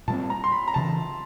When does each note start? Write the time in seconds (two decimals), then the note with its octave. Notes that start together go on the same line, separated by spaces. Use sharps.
0.08 A#2 G3 C4 A5
0.30 A#5
0.44 C6
0.52 B5
0.68 A#5
0.74 C#3 E3 A5